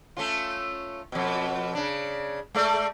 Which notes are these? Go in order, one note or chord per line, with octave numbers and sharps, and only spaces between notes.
A3 C#4 F4
F2 B2
C#3 D4
G#3 A3 D5